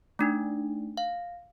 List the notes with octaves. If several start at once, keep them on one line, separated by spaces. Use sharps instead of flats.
A3 D4 D#4
F5